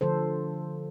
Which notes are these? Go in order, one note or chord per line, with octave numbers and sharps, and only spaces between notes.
D3 F3 A4 C5